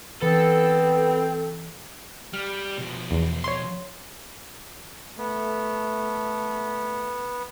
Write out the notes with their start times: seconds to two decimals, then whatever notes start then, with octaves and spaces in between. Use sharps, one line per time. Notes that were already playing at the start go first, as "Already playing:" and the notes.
0.22 E3 B3 C4 A4
2.33 G3 F6
2.77 B2 F3
3.11 E2
3.44 C#5 C6
5.18 A3 B3